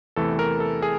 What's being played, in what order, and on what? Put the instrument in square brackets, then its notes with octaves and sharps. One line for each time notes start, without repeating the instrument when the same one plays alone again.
[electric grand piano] E2 C3 E3 A3 A4
A#4
A4
G#4